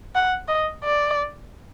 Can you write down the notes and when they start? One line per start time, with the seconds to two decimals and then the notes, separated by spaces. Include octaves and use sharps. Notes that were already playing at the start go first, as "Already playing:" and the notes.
0.15 F#5
0.48 D#5
0.83 D5